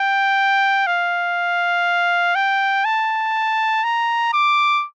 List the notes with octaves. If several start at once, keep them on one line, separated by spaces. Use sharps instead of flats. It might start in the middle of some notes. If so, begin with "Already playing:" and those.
Already playing: G5
F5
G5
A5
A#5
D6